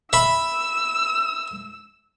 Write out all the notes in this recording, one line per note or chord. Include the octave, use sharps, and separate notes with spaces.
E5 B5 E6